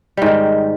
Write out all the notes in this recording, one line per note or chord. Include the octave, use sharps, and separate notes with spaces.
G#2 D#3 G3